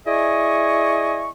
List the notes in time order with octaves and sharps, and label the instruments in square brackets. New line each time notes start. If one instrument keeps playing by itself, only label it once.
[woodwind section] E4 G#4 D5 D#5 G#5 C#6